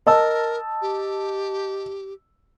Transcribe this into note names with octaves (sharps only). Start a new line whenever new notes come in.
A#4 D#5 A5 E6
G4